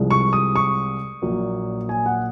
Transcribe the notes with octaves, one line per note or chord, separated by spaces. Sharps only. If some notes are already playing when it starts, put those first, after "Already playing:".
Already playing: C2 C3 F3 G#3
C#6
D#6
C#6
A#1 A#2 F#3 A#3
G#5
F#5